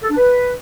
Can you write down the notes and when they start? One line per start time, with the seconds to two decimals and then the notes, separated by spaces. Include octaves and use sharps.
0.03 A4
0.10 D4
0.17 B4